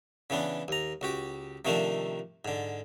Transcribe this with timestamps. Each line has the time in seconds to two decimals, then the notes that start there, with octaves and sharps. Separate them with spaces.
0.30 C#3 E3 B3 D4
0.68 D#2 A#5
1.01 C#2 F#4 G4
1.65 C3 D#3 F3 A3 A#3 D4
2.45 G#2 D3